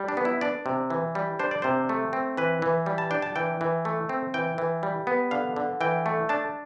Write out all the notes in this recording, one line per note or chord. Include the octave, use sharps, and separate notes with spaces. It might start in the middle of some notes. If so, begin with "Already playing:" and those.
Already playing: G3
D4
B3
E4
D4 D5
C3
E3
G3
D4 C5
D5
C3 C5
A3
C4
E3 B4
E3
G3
A5
D4 G5
A5
E3 G5
E3
A3
C4
E3 G5
E3
G3
B3
D3 F5
D3
E3 G5
A3
D4 A5